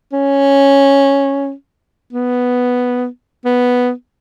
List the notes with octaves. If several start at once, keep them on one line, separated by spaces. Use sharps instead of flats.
C#4
B3
B3